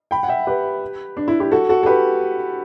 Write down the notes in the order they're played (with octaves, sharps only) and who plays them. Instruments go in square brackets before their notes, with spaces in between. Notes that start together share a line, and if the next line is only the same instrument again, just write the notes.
[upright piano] G5 B5
F#5
E5 G5
G4 B4
D4
E4
E4 G4
F#4 A4
F#4 A4
A4
G4 B4